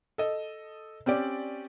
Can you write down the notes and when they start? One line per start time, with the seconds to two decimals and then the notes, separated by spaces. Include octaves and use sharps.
0.18 A4 D#5
1.06 C4 C#4 G4 D5